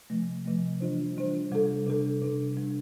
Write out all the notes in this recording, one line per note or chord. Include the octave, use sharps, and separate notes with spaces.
C3 F3 A3
C3 F3 A3
E3 G3 D4 F4 C5
E3 G3 D4 F4 C5
C3 G3 D4 A4
C3 G3 D4 A4
C3 G3 D4
C3 G3 D4